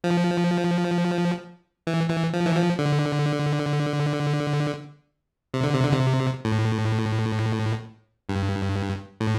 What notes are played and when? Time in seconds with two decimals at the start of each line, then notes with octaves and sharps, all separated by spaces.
0.04 F3
1.87 E3
2.10 E3
2.33 F3
2.45 E3
2.56 F3
2.79 D3
5.54 C3
5.64 D3
5.74 C3
5.83 D3
5.93 C3
6.45 A2
8.29 G2
9.21 A2